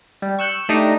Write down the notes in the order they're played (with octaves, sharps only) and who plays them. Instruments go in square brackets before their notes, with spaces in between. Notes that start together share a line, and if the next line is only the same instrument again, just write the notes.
[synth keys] G3
C#6 E6 F#6 G6
A3 D4 D#4 G4